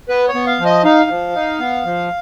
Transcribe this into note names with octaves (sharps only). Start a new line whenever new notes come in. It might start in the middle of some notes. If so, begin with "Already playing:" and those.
B3 B4
C#5
B3
F5
F3
D#5
D#4 F5
F3
D#4
B3
F3